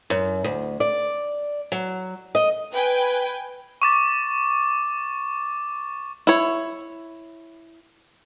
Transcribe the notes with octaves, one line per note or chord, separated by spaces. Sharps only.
F#2
D2
D5
F#3
D#5
B4 G5 G#5
C#6 D6 A6
E4 C#5